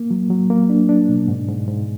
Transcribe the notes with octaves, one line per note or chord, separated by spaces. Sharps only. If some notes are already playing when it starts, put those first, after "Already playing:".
Already playing: A#3
F#3
F#3
A#3
D4
D4
B2
G#2
G#2
G#2